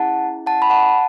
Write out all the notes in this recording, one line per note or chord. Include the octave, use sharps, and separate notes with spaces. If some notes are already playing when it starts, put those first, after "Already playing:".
Already playing: C#4 E4 G#4 F#5 A5
F#5 A5
B5
F#5 A5